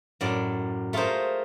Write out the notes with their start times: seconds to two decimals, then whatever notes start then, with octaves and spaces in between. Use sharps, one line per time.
0.21 F#2 A2 D5
0.93 A3 F4 G#4 A#4 C5